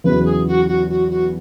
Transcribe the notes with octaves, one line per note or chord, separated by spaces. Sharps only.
E2 C#3 F#3 B3 E4 B4
G#4
F#4
F#4
F#4
F#4